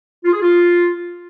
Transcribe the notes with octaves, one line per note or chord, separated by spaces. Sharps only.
F4
G#4
F4